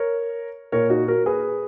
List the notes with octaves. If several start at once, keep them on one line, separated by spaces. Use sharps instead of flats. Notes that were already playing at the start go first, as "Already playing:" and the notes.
Already playing: A#4 C#5
A#2 A#4 C#5
D#4 F#4
F#4 A#4
G#4 B4